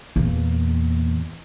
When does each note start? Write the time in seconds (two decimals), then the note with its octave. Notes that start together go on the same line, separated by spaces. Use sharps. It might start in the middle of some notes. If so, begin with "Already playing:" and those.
0.16 E2 A#2